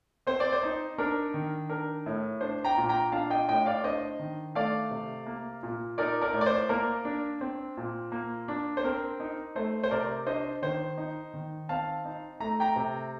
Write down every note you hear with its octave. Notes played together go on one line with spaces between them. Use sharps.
C4 C5
D5
C5
D#4
D4 A#4
D#3
D4 A#4
A2
D4 C5
G5 A#5
A#2
G5 A#5
D4 F5 A5
D#5 G5
A2 D#5 G5
D5 F5
D4 C5 D#5
D#3
A3 D5 F5
C3
A#3
A#2
D#4 A#4 D5
A#4 D5
A2
D5
C5
A#3 A#4 D5
D4
C4
A#2
A#3
D4
C5
C4 A#4
D#4
A3 C5
C5
C3 A#4 D5
D4 C5 D#5
D#3 C5
D#4
D#3
C4 F5 A5
D#4
A3 A#5
G5 A#5
C3